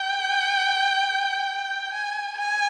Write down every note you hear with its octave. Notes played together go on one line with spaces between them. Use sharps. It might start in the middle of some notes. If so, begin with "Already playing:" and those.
Already playing: G5
G#5
G#5